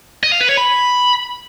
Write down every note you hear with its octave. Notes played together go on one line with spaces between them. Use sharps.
D#5
F5
B4
C#5
B5